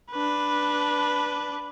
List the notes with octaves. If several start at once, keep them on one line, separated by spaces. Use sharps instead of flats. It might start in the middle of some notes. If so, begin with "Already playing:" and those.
D4 B4